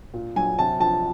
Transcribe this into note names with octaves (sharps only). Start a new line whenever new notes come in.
A#2
F#3 G#5
C3 A5
F3 A5